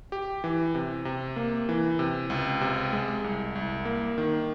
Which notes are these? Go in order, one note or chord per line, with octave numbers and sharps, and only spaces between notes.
G4
E3
C3
C3
A#3
E3
C3
C#2
C3
G#3
C2
C2
A#3
D#3